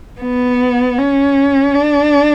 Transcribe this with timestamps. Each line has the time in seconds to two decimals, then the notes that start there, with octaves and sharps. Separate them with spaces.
0.21 B3
0.98 C#4
1.75 D4